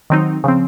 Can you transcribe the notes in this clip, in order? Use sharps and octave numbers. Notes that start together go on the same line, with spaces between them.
D#3 F#3 C4 D#4
C#3 F3 C4